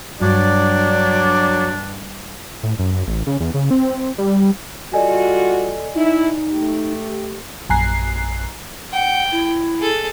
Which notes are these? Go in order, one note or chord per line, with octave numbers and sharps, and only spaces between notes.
G2 F#3 D4 D5
A2
F#2
A1
C#3
E2
C#3
C4
G3
G3 F4 F#4 A4 D5 D#5 G#5
D#4 E4
A3 G4
A#1 F#2 G#5 A#5 F#6 C7
F#5 G5
E4
G#4 A4